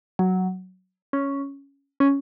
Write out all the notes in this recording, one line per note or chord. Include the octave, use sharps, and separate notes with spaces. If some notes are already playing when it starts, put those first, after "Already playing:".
F#3
C#4
C#4